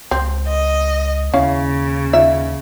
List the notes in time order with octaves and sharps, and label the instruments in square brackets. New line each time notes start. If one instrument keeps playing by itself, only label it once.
[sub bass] C#2 [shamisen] C4
[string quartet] D#5
[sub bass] D#2 [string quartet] C#3 [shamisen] C#4 E4 F5
[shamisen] D#4 F4 E5